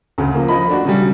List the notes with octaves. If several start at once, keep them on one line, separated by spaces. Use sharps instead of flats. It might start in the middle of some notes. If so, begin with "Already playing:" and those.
D2 C#3
F3 A#3
F3 D#5 B5
A3 D4 F#4
C#3 F#3 G3